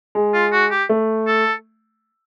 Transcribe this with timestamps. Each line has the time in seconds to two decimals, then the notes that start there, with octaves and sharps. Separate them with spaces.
0.15 G#3
0.34 F4
0.53 F#4
0.71 G4
0.89 A3
1.27 A4